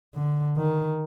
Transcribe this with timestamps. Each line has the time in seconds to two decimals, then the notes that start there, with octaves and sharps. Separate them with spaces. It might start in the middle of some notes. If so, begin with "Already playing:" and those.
0.15 D3
0.57 D#3